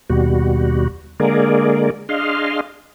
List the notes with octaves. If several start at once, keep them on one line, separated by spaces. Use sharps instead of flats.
D#2 B2 G3 F#4
D3 G#3 A#3 G#4 A#4 D5
D4 G#4 D#5 F5 C6 F6